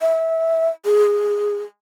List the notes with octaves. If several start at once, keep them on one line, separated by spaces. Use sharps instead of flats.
E5
G#4